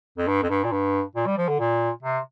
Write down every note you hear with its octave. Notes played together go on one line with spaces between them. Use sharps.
F2
G2
F2
G2
A#2
G2
A#2
G3
F3
D3
A#2
C3